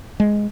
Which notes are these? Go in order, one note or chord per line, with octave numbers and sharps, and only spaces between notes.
G#3